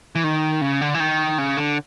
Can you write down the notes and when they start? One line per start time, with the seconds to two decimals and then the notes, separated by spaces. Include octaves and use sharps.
0.15 E3
0.24 D#3
0.61 C#3
0.81 D3
0.94 E3
1.00 D#3
1.38 C#3
1.57 D3